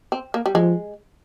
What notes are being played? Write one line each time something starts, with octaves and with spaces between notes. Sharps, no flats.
C4
A#3
G3
F3 G#3